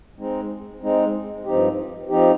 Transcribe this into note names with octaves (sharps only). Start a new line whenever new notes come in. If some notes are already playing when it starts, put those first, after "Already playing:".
G#3 C4 D#4
G#3 C4 D#4
G2 F3 C4 D#4 G4
F3 C4 D#4 G4